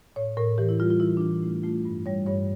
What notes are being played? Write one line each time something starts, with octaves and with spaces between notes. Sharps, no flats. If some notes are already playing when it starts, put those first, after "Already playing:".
A2 C#5
A2 A#4
E3 G4
E4
G3 F4
F4
E3 E4
D4
E3 E4
A3 E4
A3 F4
G2
G3 C#5
G2 C#5